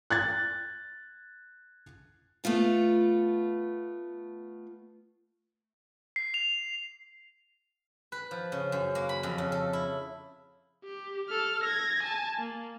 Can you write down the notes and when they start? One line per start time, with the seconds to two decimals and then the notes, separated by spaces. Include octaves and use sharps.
0.10 F#6 G#6 A6
2.44 A3 B3 F4 A4
6.16 C7
6.34 F7
8.12 B4
8.31 F3
8.52 C#3
8.72 F#2
8.95 A#3
9.09 B5
9.23 F2
9.38 C#3
9.52 A4
9.73 E4
10.84 G4
11.29 A4 F6
11.64 G#6 A#6
12.03 G#5 A5
12.39 A#3